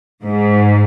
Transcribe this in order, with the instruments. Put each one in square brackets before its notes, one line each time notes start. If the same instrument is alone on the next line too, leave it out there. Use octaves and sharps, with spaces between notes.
[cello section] G#2